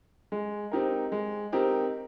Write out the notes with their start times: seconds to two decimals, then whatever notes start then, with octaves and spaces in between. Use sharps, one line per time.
0.32 G#3
0.71 C4 D#4 G4 A#4
1.12 G#3
1.52 C4 D#4 G4 A#4